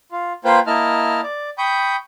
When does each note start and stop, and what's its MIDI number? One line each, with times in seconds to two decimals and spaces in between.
0.12 0.33 65
0.45 0.60 58
0.45 0.60 65
0.45 0.60 71
0.45 0.60 72
0.45 0.60 79
0.67 1.21 58
0.67 1.21 64
0.67 1.21 75
0.67 1.21 81
0.67 1.21 89
1.23 1.50 74
1.58 1.96 79
1.58 1.96 83
1.58 1.96 85
1.58 1.96 87
1.58 1.96 91